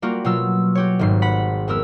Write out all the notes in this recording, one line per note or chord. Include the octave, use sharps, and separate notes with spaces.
G3 A#3 F4 F#4
B2 F#3 F4 E6
F#4 G4 C#5
G#1 G#2 C7
F#5 B5 B6
F2 B3 A#4 E6